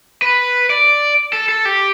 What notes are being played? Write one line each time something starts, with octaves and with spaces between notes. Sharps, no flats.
B4
D5
A4
A4
G4